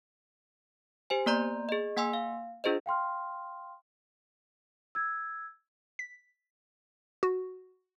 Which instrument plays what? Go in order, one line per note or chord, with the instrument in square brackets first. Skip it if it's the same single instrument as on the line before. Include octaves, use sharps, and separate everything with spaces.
[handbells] G4 C5 G#5
A#3 B3 D5 A#5 C6 G6
G#4 D#5
A#3 F#5 G#5 C6 E6
F5
D4 F4 G#4 C5 D#5
[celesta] F5 G5 C6 F6
E6 G#6
[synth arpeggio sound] B6
F#4